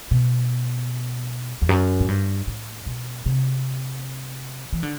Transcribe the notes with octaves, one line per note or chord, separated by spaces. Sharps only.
B2
E2
F#2
A2
G2
A2
B2
C3
E3
D3